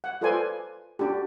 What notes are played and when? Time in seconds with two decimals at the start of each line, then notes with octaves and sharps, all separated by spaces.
0.04 F#5
0.21 F4 A4 B4 C5 D5 G#5
0.99 D4 F#4 G4